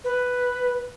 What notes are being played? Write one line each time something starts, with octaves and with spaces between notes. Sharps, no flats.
B4